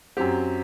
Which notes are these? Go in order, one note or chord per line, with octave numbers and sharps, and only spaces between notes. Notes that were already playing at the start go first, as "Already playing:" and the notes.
F#2 F#3 C4 G4